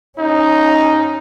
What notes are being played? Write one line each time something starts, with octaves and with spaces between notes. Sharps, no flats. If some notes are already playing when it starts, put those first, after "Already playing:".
C#4 D#4